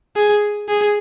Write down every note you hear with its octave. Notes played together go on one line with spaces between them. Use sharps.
G#4
G#4